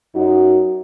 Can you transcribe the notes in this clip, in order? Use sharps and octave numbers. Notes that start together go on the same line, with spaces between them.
F#2 D#4 F#4